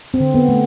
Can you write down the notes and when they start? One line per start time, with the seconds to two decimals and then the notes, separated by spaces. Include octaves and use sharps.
0.14 C4
0.20 D3
0.34 B3
0.49 A3